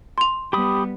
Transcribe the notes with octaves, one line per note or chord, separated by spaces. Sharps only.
C6 F7
G3 B3 G4 B5 D#6